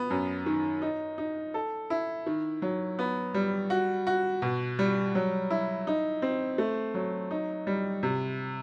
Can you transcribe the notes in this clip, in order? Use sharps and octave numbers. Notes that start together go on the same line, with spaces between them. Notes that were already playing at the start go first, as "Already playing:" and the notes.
Already playing: B3
F#2
D#3
D#4
D#4
A4
E4
D#3
F#3
B3
G3
F#4
F#4
B2
G3
F#3
E4
D#4
C4
A3
F#3
D#4
G3
C3